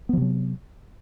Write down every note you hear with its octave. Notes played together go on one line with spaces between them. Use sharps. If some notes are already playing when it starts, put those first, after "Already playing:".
C3 F3 F#3 B3